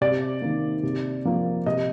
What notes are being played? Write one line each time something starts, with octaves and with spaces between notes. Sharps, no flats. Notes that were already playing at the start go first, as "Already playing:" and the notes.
C3 D5
D#3 A#3
C3
F3 A#3
C3 D#5